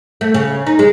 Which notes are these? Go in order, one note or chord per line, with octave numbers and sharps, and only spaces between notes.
A3
C#3
D#4
G#3